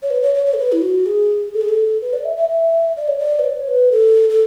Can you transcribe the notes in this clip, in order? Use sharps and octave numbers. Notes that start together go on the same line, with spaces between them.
C#5
B4
C#5
C#5
C#5
A4
B4
E4
F#4
G#4
A4
G#4
A4
B4
D5
E5
E5
E5
D5
C#5
D5
B4
C#5
B4
A4
A4